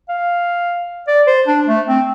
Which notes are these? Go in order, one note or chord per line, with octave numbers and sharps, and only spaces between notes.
F5
D5
C5
D4
A3
C4